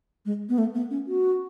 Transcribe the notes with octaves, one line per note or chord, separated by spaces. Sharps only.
G#3
B3
A3
B3
C#4
F#4